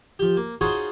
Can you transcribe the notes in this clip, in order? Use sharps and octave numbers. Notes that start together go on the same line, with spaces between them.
F3 G4
A#3
D#4 F4 F#4 G#4 C5 C#5